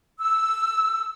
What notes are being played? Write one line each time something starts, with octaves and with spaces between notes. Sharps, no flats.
E6